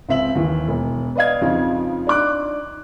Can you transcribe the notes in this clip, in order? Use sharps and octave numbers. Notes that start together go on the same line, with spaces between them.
C#2 C4 E5 F#7
D#2 E3
E1
B4 D5 D#5 F5 G#6
F2 C#3 F3 C#4 D#4 F4
D4 D#4 D6 F#6